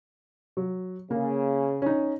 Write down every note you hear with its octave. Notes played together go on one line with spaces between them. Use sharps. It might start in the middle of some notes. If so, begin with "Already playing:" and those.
F#3
C#3 A#3
C#4 D#4